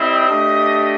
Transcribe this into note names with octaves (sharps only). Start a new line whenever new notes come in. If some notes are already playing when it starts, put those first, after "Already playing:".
Already playing: G3 C4 E4 D#5
A3 D4 G4